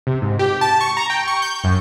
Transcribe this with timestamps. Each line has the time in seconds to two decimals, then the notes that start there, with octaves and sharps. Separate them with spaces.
0.07 C3
0.22 G#2
0.39 G4
0.61 A5
0.81 C#6
0.97 A#5
1.10 G5
1.28 C#6
1.42 G6
1.64 F#2